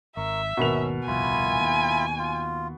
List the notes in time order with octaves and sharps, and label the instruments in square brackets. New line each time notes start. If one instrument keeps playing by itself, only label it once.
[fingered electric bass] G#1 [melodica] A#4 C#6 [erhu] E5
[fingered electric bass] G#1 D#2 [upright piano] B2 A#4 F7 [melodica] C#4
[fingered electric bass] D#1 C2 F2 [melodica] E4 F4 B5 [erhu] G#5
[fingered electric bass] D#2
[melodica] F4